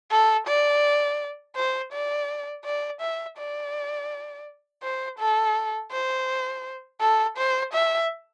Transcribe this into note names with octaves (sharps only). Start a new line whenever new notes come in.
A4
D5
C5
D5
D5
E5
D5
C5
A4
C5
A4
C5
E5